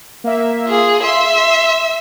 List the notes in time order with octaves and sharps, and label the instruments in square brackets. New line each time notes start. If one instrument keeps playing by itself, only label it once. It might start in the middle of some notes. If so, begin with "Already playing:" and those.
[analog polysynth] A#3 E5
[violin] F4 G#4
[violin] E5 [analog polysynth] C6